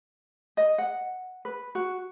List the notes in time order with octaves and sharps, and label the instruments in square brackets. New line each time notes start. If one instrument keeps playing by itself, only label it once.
[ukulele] D#5
F#5
B4
F#4